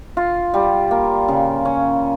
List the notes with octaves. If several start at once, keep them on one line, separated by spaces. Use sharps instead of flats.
F4
G3
A#3
C#3
C#4